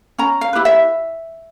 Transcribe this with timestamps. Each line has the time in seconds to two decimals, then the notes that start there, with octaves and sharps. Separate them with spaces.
0.18 C#4 A#5
0.41 F5
0.53 E4 G4 B4
0.65 E5